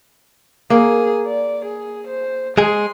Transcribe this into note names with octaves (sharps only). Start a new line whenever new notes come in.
A#3 G#4
D5
G#4
C5
G#3 G#4 C6